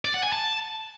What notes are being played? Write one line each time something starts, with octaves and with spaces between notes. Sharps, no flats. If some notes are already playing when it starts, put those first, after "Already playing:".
D5
F#5
G#5
A5